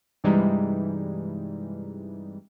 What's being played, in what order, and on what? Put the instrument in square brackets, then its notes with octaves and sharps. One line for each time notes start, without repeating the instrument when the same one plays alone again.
[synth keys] G2 C3 E3 G3 G#3 D#4